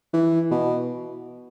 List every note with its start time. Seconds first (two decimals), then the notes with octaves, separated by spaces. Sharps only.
0.14 E3
0.51 B2